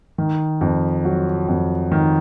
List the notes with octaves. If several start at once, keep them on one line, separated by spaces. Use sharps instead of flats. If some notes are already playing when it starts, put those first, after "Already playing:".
D#3
F2
F#3
F2
D#3